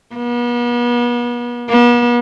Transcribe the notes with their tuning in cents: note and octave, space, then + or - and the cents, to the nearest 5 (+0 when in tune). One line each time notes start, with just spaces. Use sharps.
B3 -40
B3 -45